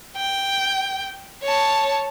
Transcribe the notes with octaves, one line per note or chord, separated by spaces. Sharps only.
G5
C#5 A5